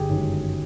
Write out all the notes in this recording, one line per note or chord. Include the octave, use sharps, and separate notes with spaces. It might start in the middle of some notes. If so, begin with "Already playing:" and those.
Already playing: G1 G4 G#4
F#2 D#3 G#3